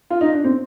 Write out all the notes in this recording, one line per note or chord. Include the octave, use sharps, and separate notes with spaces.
F4
D#4
D4
C4